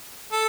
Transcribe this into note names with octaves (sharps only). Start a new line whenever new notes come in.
A4